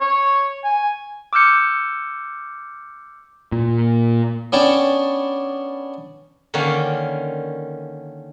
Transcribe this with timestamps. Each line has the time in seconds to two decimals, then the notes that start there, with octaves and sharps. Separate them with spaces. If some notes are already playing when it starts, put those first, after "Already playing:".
0.01 C#5
0.64 G#5
1.33 D6 E6 F6 G6 C#7
3.52 A#2
4.52 B3 C#4 D4 C#5 G5 A5
6.54 D3 D#3 A#3 C#4 D4 C#5